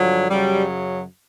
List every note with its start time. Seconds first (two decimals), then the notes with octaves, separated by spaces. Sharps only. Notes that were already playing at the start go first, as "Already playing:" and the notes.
Already playing: G2 D3 F3 F#3
0.29 F#2 C#3 F#3 G3